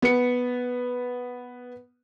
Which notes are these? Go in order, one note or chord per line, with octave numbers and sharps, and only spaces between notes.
B3 C#7